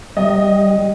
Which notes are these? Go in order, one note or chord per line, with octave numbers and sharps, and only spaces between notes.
G3 D#5